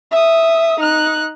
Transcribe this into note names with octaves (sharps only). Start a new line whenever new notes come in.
E5 D#6
D#4 F#6